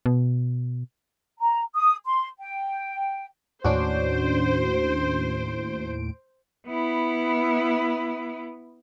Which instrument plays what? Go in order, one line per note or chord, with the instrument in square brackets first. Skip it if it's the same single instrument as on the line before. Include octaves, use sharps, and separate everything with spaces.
[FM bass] B2
[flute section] A#5
D#6
C6
G5
[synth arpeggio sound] D#2 A2 D7 [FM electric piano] C#4 D4 F#4 [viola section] C5
[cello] B3 E4